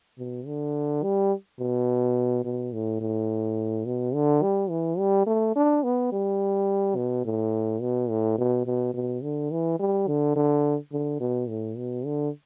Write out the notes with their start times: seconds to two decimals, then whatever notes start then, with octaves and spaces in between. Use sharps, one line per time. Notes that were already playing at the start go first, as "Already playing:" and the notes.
0.18 B2
0.46 D3
1.03 G3
1.59 B2
2.44 B2
2.73 A2
3.01 A2
3.86 B2
4.14 D3
4.42 G3
4.70 E3
4.98 G3
5.26 A3
5.56 D4
5.83 B3
6.12 G3
6.96 B2
7.25 A2
7.81 B2
8.10 A2
8.38 B2
8.66 B2
8.94 B2
9.23 D3
9.51 E3
9.79 G3
10.07 D3
10.36 D3
10.92 D3
11.20 B2
11.49 A2
11.77 B2
12.05 D3